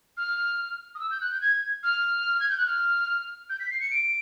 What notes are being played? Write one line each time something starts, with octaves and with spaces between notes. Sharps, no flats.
F6
D#6
E6
G6
F#6
G6
G#6
F6
G#6
G6
F#6
F6
G6
B6
C7
C#7
D7